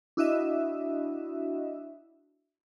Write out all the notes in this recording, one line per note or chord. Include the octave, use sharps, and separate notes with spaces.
D4 E4 F#4 D#5 E5